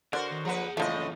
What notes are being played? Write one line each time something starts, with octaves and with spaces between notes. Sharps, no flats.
D3 F#4 A#4 C5 D5
D#3
F3 G#4 B4 F#5
F#2 A2 C#3 E3 F3 A3 D#5